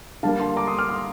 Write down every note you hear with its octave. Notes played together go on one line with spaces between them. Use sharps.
D3 G3 A#3 F5 A5
A5 C6
A#5 D6
C6 D#6
D6 F6
C6 D#6